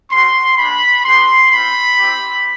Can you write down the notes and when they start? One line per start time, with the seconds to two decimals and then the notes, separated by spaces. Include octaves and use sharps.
0.10 A3 C#4 F#4 C6
0.57 A#3 D4 G4 B5
1.04 B3 D4 G4 C6
1.51 C4 F4 B5
1.99 C4 E4 G4